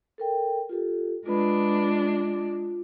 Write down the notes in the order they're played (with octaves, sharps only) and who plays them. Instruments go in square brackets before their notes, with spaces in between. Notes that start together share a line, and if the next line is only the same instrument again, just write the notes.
[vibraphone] A4 A#4 G5
F4 G4 A4
[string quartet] G#3 D4 [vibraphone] F4 B4 B5
[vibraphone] F4